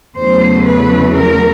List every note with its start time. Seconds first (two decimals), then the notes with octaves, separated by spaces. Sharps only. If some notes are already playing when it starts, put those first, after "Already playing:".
0.15 E2 C#3 F#3 A3 C5
0.65 B4
1.14 A#4